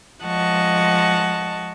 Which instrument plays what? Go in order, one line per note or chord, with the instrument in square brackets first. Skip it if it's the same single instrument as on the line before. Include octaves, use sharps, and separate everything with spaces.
[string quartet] F3 G#3 D#5 F#5 A5 C#6